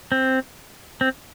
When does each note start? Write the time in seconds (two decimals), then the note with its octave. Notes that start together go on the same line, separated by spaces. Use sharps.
0.12 C4
1.01 C4